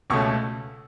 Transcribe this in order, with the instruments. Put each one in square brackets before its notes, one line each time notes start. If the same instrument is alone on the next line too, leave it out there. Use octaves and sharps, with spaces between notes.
[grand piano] C#2 B2 A3 C#4 C#6